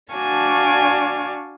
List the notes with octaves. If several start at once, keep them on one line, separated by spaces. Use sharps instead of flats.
D4 F#4 D5 F5 G#5 A5